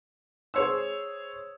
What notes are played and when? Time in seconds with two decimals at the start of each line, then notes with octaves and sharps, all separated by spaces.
0.54 G#4 C5 C#5 C6 E6